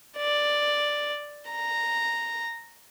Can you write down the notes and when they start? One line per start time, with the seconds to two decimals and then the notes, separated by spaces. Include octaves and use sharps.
0.17 D5
1.50 A#5